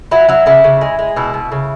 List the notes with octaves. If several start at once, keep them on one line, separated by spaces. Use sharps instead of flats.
F#3 E4
F#3 E4
C#3 E4
C#3
G#3
G#3
B2 E4
B2
C#3